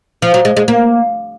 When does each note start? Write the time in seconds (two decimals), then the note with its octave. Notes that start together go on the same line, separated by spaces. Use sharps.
0.22 F3
0.34 F#3
0.45 G#3
0.57 G#3
0.68 A#3